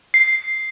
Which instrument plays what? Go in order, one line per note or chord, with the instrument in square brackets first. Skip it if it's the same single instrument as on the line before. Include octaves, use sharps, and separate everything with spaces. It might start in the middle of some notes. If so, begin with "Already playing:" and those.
[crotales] C7